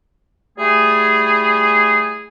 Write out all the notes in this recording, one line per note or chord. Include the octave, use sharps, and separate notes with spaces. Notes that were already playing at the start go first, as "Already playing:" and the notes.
G3 A3 E4 G#4